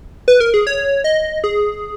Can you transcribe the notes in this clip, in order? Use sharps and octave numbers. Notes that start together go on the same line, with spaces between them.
B4
A#4
G#4
C#5
D#5
G#4